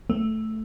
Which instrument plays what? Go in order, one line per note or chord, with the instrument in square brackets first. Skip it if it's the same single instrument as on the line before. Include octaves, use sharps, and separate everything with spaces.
[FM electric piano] A3